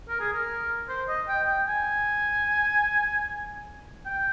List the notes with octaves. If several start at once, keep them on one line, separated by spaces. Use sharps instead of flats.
A#4
G#4
A#4
C5
D#5
G5
G5
G#5
G5